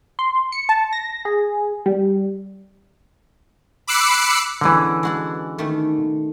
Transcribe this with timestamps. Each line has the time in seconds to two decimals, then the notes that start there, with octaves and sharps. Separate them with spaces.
0.19 C6
0.52 C#7
0.69 A5
0.93 A#6
1.25 G#4
1.86 G3
3.87 B5 D6 E6 F#6 C7 C#7
4.61 D3 E3 G#3 B3 C#4
5.03 G#3 F#4 A4
5.58 D#3 A3